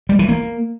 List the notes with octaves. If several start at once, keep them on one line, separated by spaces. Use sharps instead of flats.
G3
E3
A#3